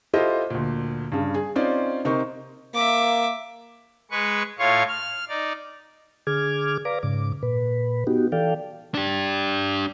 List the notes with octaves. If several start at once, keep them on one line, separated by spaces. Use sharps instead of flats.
E4 F4 G4 A4 C5 D#5
D2 A#2
G2 C#3
G#4
C4 C#4 D#4 F4 C5 D5
C3 D#4 A#4 C5 C#6
A#3 E5 D6
G#3 B4 C#6
A2 F4 C#5 F5 C#6
F6
D#4 D5
D3 G#4 D6 F6 G#6
B4 D5 F5 A#5 D6
G#2 C#3 D6
A#2 B4
B3 D#4 F#4 G4
E3 A4 D5 F5 G5
D4 G4